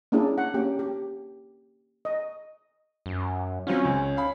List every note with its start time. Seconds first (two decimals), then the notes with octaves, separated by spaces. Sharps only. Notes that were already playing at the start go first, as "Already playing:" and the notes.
0.12 A#3 C#4 D4 E4 G#4
0.38 F#5
0.54 A#3 C#4 G4 G5
0.79 G4
2.05 D#5
3.06 F#2
3.67 F#3 C4 C#4 F4
3.85 C#2
4.17 F5 B5